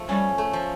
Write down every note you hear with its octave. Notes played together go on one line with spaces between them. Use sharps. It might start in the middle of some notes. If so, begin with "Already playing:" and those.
Already playing: F3 A3
G3 C#4
A3
F3